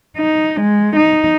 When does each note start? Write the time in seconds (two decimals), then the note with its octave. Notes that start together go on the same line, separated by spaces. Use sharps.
0.17 D#4
0.61 G#3
0.96 D#4